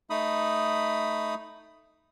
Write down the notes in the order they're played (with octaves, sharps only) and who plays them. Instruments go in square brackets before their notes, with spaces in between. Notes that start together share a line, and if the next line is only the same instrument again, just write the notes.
[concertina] A3 D#4 B5 D#6